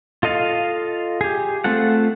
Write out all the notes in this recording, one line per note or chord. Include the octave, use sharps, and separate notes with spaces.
F4 A4 D#5 F5
G4 G#4
A3 C4 F4 A4 F#5